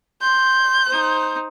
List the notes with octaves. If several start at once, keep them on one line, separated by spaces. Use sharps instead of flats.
C6 G6
D#4 C5